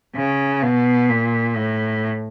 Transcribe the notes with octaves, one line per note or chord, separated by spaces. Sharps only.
C#3
B2
A#2
A2